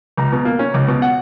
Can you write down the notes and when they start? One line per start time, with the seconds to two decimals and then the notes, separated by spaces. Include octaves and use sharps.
0.17 C#2 A#5
0.32 B2
0.45 A#3
0.59 C#4
0.74 C#2
0.88 B2
1.02 F#5